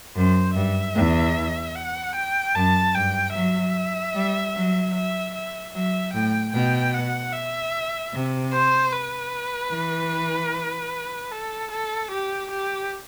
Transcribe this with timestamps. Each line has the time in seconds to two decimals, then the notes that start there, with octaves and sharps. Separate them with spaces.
0.16 F#2 C5
0.55 G2 E5
0.95 E2
1.75 F#5
2.15 G5
2.55 F#2 A5
2.95 G2 G5
3.35 F#3 E5
4.15 G3
4.55 F#3
4.95 E5
5.34 E5
5.74 F#3 E5
6.13 A2 G5
6.53 B2 G5
6.94 F#5
7.33 E5
8.13 C3
8.53 C5
8.92 B4
9.72 E3
11.31 A4
11.71 A4
12.11 G4
12.51 G4